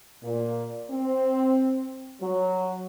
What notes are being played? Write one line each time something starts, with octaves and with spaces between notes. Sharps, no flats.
A#2
C4
F#3